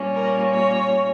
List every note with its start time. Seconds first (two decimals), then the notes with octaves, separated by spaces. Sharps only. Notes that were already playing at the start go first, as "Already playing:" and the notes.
Already playing: A#2 G3 A#3 C#4
0.14 A#4
0.50 C#5